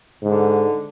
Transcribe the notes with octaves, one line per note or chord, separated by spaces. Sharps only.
G#2 D3